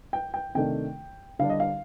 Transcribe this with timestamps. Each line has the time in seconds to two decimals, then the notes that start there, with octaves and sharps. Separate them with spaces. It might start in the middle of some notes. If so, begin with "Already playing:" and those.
0.13 G5
0.34 G5
0.55 C3 D#3 A3 D4 G5
1.39 D3 G3 D4 F5
1.50 D#5
1.60 F5